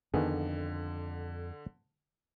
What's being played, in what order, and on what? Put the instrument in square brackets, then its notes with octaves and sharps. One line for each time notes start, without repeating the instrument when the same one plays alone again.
[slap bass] F2 [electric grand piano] D3 [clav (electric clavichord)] D#3 B3 G#4